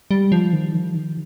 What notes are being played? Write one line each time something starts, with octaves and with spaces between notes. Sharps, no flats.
G3
F3
D#3
F3
D#3